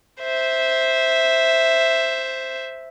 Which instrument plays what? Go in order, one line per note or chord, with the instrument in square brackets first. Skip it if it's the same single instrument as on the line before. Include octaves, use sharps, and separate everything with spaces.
[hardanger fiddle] C5 E5